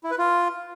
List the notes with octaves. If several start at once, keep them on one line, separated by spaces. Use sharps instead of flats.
E4
B4
F4